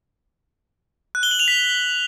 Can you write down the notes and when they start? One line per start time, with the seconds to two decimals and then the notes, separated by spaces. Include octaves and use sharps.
1.15 F#6
1.23 G7
1.31 F#7
1.39 F7
1.48 B6